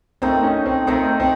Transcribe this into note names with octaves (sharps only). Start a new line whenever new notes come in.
D#3 A3 C4 D#4
C#4
C4
D#3 A3 C4 D#4
C4